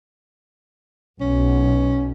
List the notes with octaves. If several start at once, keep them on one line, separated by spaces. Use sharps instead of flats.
B1 C#4